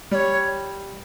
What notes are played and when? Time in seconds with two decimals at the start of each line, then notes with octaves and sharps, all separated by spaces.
0.11 G3 D5
0.15 C#5